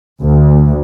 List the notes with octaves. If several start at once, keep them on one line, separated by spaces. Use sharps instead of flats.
D2